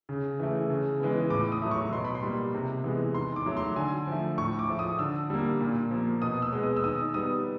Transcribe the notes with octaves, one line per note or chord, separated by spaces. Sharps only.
C#3
E3 A3
C#3
E3 G#3 B3
A2 D6
D#6
F#3 A3
C#6
B2 C6
B5
C6
G3 A#3
C3
E3 G#3 B3
D#3 C6
D6
F#3 A3
C6
D3 G#5
F3 A3
A2 C#6
D6
F3 A3
D#6
D3 E6
G3 A#3
A#2
F3 A#3
B2 D#6
E6
G#3 B3
D#6
E6
D#3 D#6
G3 B3 D#6